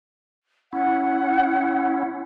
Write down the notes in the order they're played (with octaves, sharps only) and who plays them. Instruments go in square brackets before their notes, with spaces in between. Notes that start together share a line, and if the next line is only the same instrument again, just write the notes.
[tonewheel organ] C#4 E4 [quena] F#5